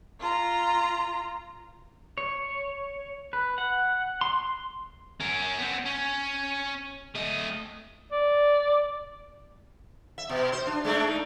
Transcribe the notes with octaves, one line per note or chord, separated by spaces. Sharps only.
F4 A#5
C#5
B4
F#5
C6
C6
C#4 A#4
B3 C4
C#4
A3 D#5
D5
E5
B2
C5
D4
G#3 A3 D4
D#4